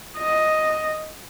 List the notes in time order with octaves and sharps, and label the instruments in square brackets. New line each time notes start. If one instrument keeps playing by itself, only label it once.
[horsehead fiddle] D#5